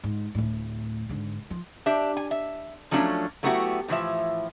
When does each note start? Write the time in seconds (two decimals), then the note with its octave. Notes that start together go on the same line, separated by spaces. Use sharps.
0.04 G#2
0.35 D1 A2
1.09 G#2 D3
1.51 F3
1.86 D4 G4 E5
2.17 G#5
2.31 E5
2.91 F3 F#3 A3 C#4 D4
3.43 F#3 A3 B3 E4 F#4 G4
3.88 A2 E3 F3 E5